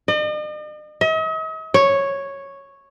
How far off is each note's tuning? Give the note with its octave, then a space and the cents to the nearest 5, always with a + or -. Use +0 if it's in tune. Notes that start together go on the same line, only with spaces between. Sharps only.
D#5 -45
D#5 +45
C#5 -5